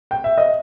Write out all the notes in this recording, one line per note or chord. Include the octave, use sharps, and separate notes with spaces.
G5
E5
D#5